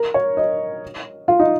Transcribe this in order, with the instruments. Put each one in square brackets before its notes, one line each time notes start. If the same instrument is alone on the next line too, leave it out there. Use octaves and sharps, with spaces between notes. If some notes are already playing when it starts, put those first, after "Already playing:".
Already playing: [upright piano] A#4
C#5
D#5
F4
D#4